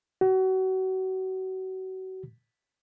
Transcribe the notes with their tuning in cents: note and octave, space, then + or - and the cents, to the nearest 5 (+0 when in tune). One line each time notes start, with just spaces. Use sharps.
F#4 +30